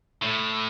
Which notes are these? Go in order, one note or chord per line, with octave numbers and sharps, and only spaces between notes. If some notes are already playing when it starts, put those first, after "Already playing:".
A2